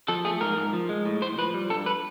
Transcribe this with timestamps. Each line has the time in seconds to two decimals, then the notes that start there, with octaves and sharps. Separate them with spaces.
0.08 F3 A4
0.25 A3 G#4
0.41 G#2 A#4
0.57 G#2
0.73 F3
0.89 G#3
1.06 A2
1.22 A2 C5
1.38 F3 B4
1.54 G3
1.70 G2 A4
1.86 B4